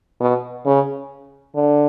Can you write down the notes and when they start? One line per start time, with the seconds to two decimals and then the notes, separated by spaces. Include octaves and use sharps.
0.20 B2
0.66 C#3
1.55 D3